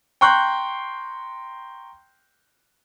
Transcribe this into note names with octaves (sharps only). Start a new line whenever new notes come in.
G5 A#5 C6 C#6 F#6 G6